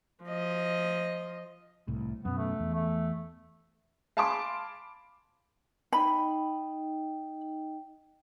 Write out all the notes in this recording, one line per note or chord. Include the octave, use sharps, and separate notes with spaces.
F3 D#5
C2 A2
F#2 B2 B3
A3
E2
A3
F5 G#5 A5 B5 C6 D6
D#4 D#5 G5 B5